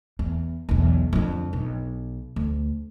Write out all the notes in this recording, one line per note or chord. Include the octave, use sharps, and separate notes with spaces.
E2
B1 E2
F2 D3
B1
D2